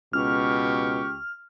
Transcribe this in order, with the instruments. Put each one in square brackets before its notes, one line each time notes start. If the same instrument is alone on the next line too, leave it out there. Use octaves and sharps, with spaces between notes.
[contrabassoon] C#2 [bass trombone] B2 [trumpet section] G4 C#6 [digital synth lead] F6